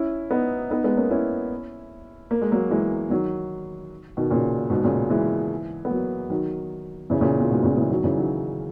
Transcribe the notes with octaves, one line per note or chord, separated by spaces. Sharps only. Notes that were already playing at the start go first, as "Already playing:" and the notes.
Already playing: C#4 E4
B3 D#4
B3 D#4
G#3 B3
A#3 C#4
C#4 E4
A#3
G#3
F#3 A#3
E3 G#3
D#3 F#3
B2 D#3
A#2 C#3
G#2 B2
A#2 C#3
E3 G#3
B3
F#3 A#3
D#3 F#3
C#3 E3
A#2 C#3
A#2
G#2 B2
A#2 C#3
C#3 E3
D#3 F#3
C#3 E3
D#3 F#3